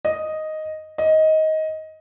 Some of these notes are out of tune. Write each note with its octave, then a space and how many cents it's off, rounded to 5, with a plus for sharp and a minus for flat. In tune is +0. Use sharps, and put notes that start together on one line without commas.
D#5 +0
D#5 +15